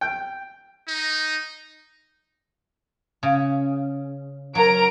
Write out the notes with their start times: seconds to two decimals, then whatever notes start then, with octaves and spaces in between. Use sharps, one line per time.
0.01 G5
0.88 D#4
3.23 C#3
4.55 F#3 A#4 A#5 D7